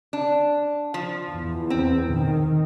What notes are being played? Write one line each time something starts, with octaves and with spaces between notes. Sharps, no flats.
D4
F3
E2
C4
D#3